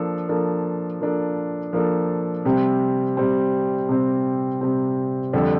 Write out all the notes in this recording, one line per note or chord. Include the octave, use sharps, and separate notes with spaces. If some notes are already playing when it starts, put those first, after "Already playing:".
Already playing: F3 A#3 D4 A4
F3 A#3 D4 A4
F3 A#3 D4 A4
F3 A#3 D4 A4
C3 G3 C4
C3 G3 C4
C3 G3 C4
C3 G3 C4
F2 D3 G3 D4 A4